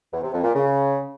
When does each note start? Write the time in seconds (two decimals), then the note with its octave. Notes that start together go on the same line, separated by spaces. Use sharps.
0.12 E2
0.22 C3
0.33 F2
0.43 A#2
0.53 C#3